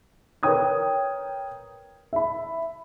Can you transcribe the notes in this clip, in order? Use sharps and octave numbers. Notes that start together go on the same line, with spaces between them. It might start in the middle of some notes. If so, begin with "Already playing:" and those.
A#4 B4 C#5 G5 D#6 G#6
E5 B5